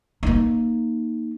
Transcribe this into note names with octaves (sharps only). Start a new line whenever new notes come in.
A#3 D#4